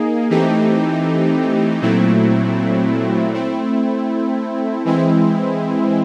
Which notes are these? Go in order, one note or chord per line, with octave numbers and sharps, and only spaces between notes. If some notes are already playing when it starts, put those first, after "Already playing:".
Already playing: A#3 D#4 G#4
E3 A3 C4 D#4 G4
A#2 F#3 A3 C4 E4
A3 C4 E4
E3 G#3 C4 E4